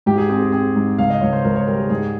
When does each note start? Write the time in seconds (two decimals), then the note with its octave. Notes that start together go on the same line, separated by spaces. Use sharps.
0.06 G#2 G4
0.18 G#4
0.29 C4 G#4
0.42 G#4
0.52 C4 G#4
0.76 G#2
0.98 C#2 F5
1.10 D#5
1.21 C#2 C#5
1.33 C5
1.45 C#2 A#4
1.56 C#5
1.67 G3 A#4
1.80 G#4
1.90 G#2 G#4